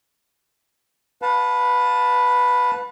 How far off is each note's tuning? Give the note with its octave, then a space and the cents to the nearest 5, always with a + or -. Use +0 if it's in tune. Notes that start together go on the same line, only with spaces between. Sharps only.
B4 +0 F5 +45 A5 +0